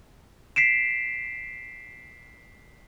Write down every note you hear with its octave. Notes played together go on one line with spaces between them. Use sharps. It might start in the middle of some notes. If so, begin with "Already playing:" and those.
B6 C7 D7 E7